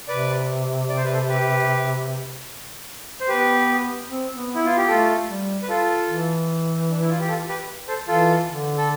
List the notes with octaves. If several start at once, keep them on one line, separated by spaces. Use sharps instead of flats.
C3 B4 D5
D5
C5
B4
A4 C5
G4 B4
C5
B3 G4 B4
C4
B3
E4
B3 F4
G4
A3 F4 A4
G3
B4
F4 A4
E3
D4
E4
F4
G4
F4 A4
G4 B4
A4 C5
E3 F4 A4
D3
A4